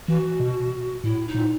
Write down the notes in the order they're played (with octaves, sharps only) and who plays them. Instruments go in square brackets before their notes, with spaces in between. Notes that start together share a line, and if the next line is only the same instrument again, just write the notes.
[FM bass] E3 [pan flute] F#4
[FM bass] B2
[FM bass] A2 [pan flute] E4
[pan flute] D#4
[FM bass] A#2